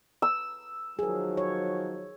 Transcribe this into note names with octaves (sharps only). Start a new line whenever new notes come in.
E6
D#3 F3 F#3 G#4 A#4
C#5